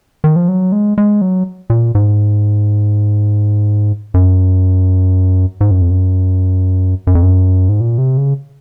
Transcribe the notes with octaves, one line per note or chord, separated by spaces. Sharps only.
D#3
F3
F#3
G#3
G#3
F#3
A#2
G#2
F#2
G#2
F#2
F2
F#2
F#2
F2
F#2
G#2
A#2
C3
C#3